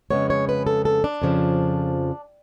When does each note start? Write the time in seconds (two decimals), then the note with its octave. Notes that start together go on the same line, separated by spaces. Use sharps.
0.11 F2 C#3 G#3 B3 C#5
0.30 C#5
0.49 B4
0.67 A4
0.85 A4
1.04 D4
1.22 F2 C#3 F3